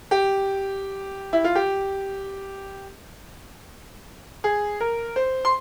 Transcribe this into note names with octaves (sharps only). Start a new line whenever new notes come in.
G4
E4
F4
G4
G#4
A#4
C5
C6